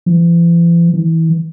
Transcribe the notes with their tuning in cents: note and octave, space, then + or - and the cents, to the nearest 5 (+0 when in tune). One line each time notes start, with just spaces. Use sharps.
E3 +45
E3 -25